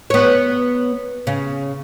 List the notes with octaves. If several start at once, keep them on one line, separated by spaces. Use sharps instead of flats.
B3 C#5
C#3